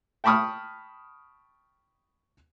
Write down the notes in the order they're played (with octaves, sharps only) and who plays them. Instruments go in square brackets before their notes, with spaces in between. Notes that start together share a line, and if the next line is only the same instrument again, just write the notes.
[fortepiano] G5 A5 B5 C#6 D#6 F6